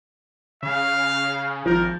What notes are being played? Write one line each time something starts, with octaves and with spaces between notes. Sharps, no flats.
C#3 F5
G#1 F3 A#4